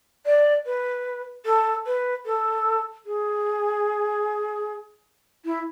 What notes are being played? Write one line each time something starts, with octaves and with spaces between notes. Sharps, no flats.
D5
B4
A4
B4
A4
G#4
E4